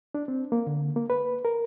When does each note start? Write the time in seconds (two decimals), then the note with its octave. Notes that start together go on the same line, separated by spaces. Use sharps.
0.15 D4
0.28 C4
0.52 A#3
0.67 D3
0.96 A#3
1.10 B4
1.45 A#4